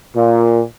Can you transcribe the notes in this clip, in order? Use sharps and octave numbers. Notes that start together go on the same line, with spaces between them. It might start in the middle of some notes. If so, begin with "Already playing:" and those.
A#2